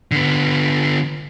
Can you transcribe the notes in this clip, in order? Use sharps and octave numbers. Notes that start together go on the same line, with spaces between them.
D3 B3